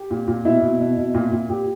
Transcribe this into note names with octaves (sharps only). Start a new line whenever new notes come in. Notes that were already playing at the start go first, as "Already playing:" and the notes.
Already playing: G4
A#2
A#2
B2 E4
B2
B2
B2
A#2
A#2
A#2 G4